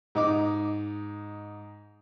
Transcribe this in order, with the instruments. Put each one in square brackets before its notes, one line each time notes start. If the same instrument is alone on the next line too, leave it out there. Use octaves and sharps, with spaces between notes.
[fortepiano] G#2 D#4 D6